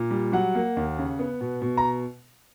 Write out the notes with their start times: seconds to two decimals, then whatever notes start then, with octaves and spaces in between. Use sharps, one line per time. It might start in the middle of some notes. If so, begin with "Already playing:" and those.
Already playing: A#2
0.11 G3
0.32 F#3 F#5
0.55 A#3
0.77 D#2
0.98 C#3
1.19 B3
1.41 B2
1.62 B2
1.77 A#5